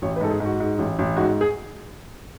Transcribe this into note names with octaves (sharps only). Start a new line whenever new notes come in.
A1 C#5
B4
G#2 A4
G#4
G#2
F#4
G#2
A1
A1
G#2 F#4
G#4